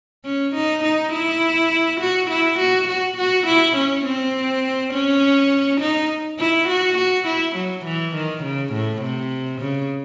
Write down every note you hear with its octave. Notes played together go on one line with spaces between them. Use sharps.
C#4
D#4
D#4
E4
F#4
E4
F#4
F#4
F#4
E4
C#4
C4
C#4
D#4
E4
F#4
F#4
E4
F#3
E3
D#3
C#3
A2
C3
C#3